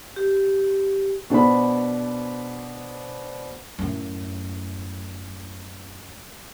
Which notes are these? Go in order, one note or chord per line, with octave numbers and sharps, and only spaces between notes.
G4
B2 D4 C5 B5
F#2 A2